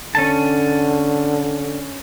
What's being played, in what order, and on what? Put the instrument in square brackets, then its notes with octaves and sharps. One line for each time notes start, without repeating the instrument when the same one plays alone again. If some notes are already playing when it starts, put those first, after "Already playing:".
[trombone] D3 [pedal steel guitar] C#4 A5